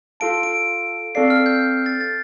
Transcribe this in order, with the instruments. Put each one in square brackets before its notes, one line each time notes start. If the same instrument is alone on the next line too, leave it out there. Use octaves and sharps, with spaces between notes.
[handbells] F4 A4 F5 A5 [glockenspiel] D7
[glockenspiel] D7
[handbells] C4 A4 D5 F5 [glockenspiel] C7
[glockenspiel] F6
G6
A6
A6